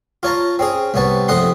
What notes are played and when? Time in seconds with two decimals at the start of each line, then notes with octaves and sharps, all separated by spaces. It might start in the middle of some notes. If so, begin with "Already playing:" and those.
0.23 F4 C#5 A5 A#5
0.59 C4 C#4 G#4
0.94 C2 C3 B3 C#5 A5
1.28 F2 C3 A3 D#5 F#5 C6